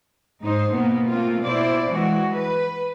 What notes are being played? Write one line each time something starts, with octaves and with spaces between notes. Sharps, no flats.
G#2 D#4 C5
B2 A#3 B3
A3 A#3 C4 F4
B2 E4 C5 D5
E3 G#3 F#4
B4